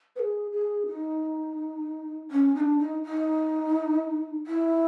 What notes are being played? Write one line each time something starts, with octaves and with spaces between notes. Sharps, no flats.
B4
G#4
G#4
D#4
C#4
D#4
D4
D#4
D#4
E4